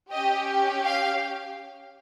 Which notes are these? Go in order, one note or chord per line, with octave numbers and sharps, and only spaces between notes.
C#4 G4 D#5
F5